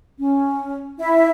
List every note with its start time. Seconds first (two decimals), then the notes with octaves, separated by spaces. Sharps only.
0.18 C#4
0.99 E4 E5